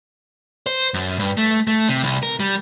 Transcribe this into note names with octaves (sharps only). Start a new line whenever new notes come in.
C5
F#2
G2
A3
A3
C3
C2
A#4
G3